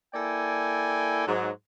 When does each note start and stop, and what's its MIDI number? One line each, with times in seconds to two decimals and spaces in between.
0.14 1.23 58
0.14 1.23 64
0.14 1.23 69
0.14 1.23 74
0.14 1.23 79
0.14 1.23 80
1.27 1.50 44
1.27 1.50 54